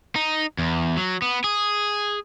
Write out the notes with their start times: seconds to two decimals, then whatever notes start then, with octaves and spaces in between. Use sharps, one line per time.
0.16 D#4
0.59 E2
0.97 F#3
1.22 B3
1.44 G#4